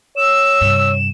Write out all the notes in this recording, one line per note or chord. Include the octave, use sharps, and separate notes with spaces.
C#5 E6 E7
G2 C3